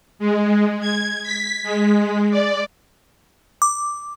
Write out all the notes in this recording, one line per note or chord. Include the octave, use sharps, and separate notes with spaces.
G#3
G#6
B6
G#3
D5
D6